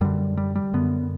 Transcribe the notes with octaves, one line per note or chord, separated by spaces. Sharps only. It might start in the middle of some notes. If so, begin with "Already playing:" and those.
F#2 D3 G3
G3
G3
F#2 D3 B3